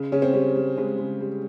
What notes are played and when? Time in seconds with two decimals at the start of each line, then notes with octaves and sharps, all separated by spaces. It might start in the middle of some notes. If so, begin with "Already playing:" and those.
Already playing: C#3
0.12 C#3 C#4
0.22 C4
0.33 G3 C#4
0.56 G3
0.77 C#3 G#3
0.99 C#3
1.21 G3